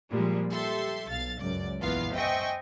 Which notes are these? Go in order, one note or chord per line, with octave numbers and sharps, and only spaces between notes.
A#2 F3 G3 G#3
G4 A4 E5 C6
B1 F5 A6
C#2 F#2 D5
A#1 E2 B3 F4 F5
C5 D#5 E5 G5 G#5 C#6